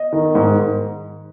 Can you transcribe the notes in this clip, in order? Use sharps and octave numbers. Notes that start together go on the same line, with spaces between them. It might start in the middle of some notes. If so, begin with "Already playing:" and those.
Already playing: D#5
D#3
G#2